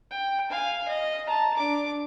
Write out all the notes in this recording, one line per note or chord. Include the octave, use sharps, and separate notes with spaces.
G5
F5 G#5
D#5
A5 A#5
D4 D6